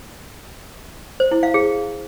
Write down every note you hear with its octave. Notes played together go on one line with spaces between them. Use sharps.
C5
E4
F5
G#4